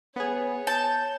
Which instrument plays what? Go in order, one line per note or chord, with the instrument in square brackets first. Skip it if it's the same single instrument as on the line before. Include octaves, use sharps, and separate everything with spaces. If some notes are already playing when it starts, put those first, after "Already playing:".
[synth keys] B3 G#4 [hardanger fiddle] C#5
[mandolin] A5 [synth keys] G6 E7